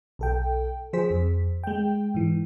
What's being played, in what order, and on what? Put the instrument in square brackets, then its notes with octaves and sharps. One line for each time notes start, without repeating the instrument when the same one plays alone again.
[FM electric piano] B1 A4 G5
F3 G#4 C5 B6
F2
G#3 G5
G#2 E3